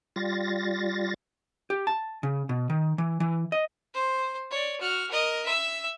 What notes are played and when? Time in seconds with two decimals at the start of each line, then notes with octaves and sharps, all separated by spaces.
0.16 G3 F4 A6 A#6
1.70 G4
1.87 A5
2.23 C#3
2.49 B2
2.70 D#3
2.98 E3
3.20 E3
3.52 D#5
3.94 C5
4.51 C#5 D5
4.81 F#4 F6
5.11 A#4 D#5
5.46 E5 E6